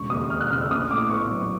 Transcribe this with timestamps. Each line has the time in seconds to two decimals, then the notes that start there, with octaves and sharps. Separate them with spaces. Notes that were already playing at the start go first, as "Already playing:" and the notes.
Already playing: E1 C#3 C#6
0.10 D#2 D#6
0.30 E1 F6
0.41 F#6
0.50 C#3 F6
0.60 E6
0.71 A#1 D#6
0.91 A2 D6
1.10 B3 C#6
1.31 F#3